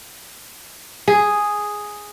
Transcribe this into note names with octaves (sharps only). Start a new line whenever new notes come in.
G#4